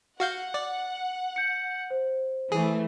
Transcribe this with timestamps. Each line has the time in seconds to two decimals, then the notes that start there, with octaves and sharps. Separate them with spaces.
0.20 F#4 F5 F#5 G6
0.54 D5
1.36 G6 C#7
1.90 C5
2.52 E3 A3 G#4